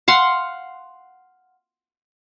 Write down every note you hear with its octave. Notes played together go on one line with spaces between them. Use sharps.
F5 F#5 C6